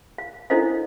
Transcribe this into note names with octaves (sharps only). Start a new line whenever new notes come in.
F5
D4 E4 A4 C5 D#5 F5